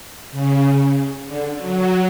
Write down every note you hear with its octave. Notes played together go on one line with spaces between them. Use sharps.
C#3
D3
F#3